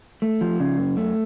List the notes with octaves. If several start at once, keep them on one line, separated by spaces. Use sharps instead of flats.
A3
F3
C#3
F#2
A3